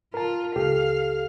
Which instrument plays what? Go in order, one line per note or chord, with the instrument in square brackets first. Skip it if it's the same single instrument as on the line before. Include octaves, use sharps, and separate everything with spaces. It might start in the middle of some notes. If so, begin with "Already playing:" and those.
[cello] F4 [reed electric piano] A#4 A5
[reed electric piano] C#2 G4 A4 [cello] F5